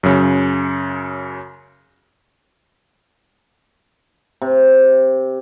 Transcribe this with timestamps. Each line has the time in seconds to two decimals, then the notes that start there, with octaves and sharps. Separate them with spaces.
0.03 F#2 C#3
4.42 C3